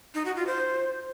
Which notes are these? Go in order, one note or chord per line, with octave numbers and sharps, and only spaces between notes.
D#4
F#4
F4
C5